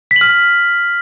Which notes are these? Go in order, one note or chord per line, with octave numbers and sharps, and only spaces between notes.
B6
F#7
F6